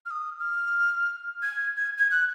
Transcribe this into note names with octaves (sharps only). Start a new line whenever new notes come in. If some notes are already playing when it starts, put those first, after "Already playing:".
F6
D#6
F6
G#6
G#6
G#6
F#6